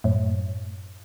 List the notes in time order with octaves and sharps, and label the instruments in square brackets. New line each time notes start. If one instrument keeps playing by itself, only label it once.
[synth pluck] F#2 A2